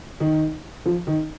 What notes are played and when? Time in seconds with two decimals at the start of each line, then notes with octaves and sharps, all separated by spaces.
0.20 D#3
0.86 F3
1.07 D#3